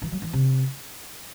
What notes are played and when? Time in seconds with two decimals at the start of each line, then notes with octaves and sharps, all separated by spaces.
0.02 E3
0.12 F#3
0.22 E3
0.33 C3